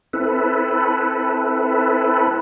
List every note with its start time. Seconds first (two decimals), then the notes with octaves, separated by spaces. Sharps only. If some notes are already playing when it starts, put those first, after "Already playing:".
0.13 C4 E4 A4 B4